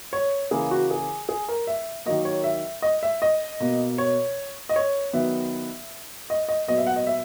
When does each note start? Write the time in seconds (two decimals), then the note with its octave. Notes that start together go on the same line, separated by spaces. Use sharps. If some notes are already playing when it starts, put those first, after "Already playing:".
0.13 C#5
0.51 C#3 E3 A#3 G#4
0.71 F#4
0.91 G#4
1.29 G#4
1.48 A#4
1.67 E5
2.06 D#3 F#3 A#3 D#5
2.25 C#5
2.44 E5
2.82 D#5
3.03 E5
3.22 D#5
3.60 B2 A#3
3.98 C#5
4.69 D#5
4.76 C#5
5.13 D#3 F#3 B3 E5
6.30 D#5
6.49 D#5
6.67 A#2 F#3 B3 D#5
6.78 E5
6.87 F#5
6.96 D#5
7.07 E5